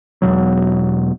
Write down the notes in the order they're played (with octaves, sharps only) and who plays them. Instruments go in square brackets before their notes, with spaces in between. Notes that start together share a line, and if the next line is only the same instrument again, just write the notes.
[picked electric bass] E1 B2 F#3